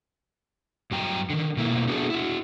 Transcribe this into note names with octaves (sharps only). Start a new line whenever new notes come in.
G2 F#3 G5 A#5
D3 D#3
B2 A3 A#3 E4
A3 B3 D4 F#4 G#4 A4
E4 F#4